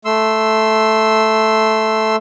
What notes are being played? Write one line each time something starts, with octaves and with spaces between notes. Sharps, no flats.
A3 C6 E6